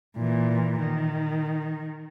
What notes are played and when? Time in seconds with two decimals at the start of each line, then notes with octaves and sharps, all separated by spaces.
0.17 A#2 E3
0.80 D#3